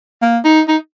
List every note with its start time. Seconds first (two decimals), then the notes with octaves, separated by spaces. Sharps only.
0.22 A#3
0.44 D#4
0.68 D#4